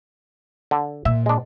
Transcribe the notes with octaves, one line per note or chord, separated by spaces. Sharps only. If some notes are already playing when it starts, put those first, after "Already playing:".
D3
A#2 E5
G#3 D4